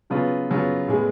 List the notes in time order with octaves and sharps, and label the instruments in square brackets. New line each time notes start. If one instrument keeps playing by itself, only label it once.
[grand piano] C#3 F#3 B3 F4
C#3 F#3 B3 F4
A2 G#3 B3